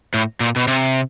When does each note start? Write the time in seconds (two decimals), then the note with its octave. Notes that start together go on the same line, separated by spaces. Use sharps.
0.14 A2
0.40 A#2
0.56 B2
0.68 C3